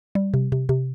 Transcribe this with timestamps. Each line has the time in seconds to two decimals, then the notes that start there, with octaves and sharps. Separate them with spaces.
0.15 G3
0.34 C3
0.52 C3
0.69 C3